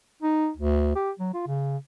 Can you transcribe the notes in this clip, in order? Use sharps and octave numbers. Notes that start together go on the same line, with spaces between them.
D#4
D2
G4
F#3
F4
C#3